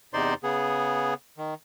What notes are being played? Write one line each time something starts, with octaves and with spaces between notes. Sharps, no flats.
E2 C3 D#4 C5 D5 C6
C#3 B3 G#4
D#3